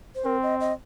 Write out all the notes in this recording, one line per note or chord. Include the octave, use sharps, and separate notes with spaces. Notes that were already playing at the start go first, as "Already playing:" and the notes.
C5
C4 A#4
D#5
D#5